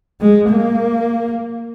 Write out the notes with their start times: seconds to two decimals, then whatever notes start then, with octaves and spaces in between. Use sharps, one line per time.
0.21 G#3
0.50 A#3